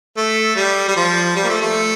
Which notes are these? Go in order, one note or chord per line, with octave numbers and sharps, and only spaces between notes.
A3
G3
G3
F3
G3
A#3
A3
A3